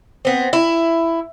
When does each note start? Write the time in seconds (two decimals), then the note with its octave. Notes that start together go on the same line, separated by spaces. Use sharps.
0.25 B3 C4
0.53 E4